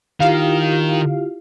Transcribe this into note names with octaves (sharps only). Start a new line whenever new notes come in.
D#3 E4 F4 G4 F5